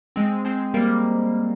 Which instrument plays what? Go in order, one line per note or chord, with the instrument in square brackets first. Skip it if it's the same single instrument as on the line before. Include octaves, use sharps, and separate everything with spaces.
[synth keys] G#3 C4
G#3 C4
G3 A#3